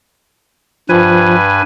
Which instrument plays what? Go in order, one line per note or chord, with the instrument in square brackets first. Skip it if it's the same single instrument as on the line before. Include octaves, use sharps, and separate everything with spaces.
[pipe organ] G2 B4 G#5 [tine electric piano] F3